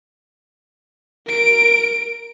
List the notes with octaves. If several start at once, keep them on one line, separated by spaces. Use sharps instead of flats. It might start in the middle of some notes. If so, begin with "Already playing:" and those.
A#4 D7